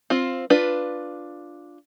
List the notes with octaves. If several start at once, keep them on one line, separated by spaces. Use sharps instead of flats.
C4 F4
D4 F4 B4